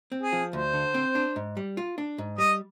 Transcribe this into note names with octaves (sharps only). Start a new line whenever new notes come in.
C4
G#4
F3
D2 C5
D3
C4
D4
G#2
G3
F4
D4
G#2
G3 D#5